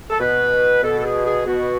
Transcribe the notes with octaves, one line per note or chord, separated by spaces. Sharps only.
A4
B2 B4
B2 A4
A4
G#4
G#4
B2 F#4